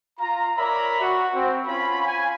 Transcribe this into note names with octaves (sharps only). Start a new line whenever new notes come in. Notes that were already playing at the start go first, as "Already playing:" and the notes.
F4 A#5
A#4 C#5 D5 E5 A#5 B5
F#4
C4
C#4 F4 C#5 B5
G#5